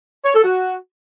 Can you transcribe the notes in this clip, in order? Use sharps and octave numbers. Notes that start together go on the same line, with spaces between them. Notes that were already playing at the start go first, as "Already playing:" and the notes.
C#5
A4
F#4